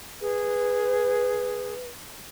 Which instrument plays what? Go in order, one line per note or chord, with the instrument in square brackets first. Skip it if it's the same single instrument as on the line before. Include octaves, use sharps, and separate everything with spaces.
[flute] G#4 [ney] B4